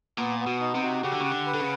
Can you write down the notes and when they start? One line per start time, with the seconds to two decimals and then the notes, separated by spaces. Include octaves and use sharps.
0.18 A#2 B3
0.40 B3
0.47 B2
0.61 D#4
0.75 C3
0.83 F#4
1.03 C#3 G4
1.12 D3
1.21 C#3 F#5
1.31 D3
1.46 B4
1.54 D3
1.60 C#3